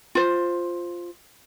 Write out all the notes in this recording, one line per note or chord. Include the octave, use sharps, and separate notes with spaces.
F4 C5